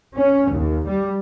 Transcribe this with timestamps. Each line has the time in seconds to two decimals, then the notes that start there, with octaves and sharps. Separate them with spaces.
0.14 C#4
0.50 D#2
0.87 G3